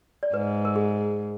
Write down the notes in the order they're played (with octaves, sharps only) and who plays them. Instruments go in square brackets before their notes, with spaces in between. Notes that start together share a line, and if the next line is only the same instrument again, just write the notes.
[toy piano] D5
[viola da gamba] G#2 [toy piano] B4
[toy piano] A#4
G#4